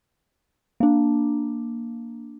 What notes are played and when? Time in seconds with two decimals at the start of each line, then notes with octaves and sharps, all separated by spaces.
0.80 A#3 D4